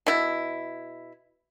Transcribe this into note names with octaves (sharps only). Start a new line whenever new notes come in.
B2 E4